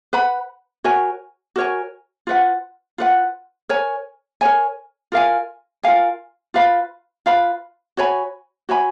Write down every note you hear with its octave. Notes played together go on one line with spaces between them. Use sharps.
B4 F#5 B5
F#4 A#4 C#5 G#5
F#4 A#4 C#5 G#5
F4 B4 F#5
F4 B4 F#5
A#4 C#5 G#5
A#4 C#5 G#5
F4 A#4 F5 G#5
F4 A#4 F5 G#5
F4 B4 F5 B5
F4 B4 F5 B5
F#4 C#5 G#5 B5
F#4 C#5 G#5 B5